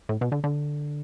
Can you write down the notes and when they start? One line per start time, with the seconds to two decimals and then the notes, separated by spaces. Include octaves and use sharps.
0.09 A2
0.21 B2
0.32 D3
0.44 D3